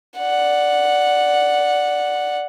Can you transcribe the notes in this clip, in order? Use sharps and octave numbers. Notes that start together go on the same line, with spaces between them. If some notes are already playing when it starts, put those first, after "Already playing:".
D5 F#5